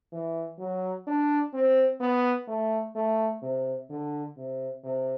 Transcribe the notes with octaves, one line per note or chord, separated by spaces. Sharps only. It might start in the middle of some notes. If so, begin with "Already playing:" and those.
E3
F#3
D4
C4
B3
A3
A3
C3
D3
C3
C3